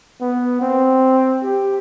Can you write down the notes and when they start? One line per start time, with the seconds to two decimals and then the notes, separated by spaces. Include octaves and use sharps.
0.21 B3
0.61 C4
1.43 G4